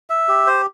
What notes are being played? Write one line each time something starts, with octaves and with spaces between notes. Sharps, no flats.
E5
G4
C5